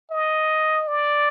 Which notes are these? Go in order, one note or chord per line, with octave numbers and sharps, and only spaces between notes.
D#5
D5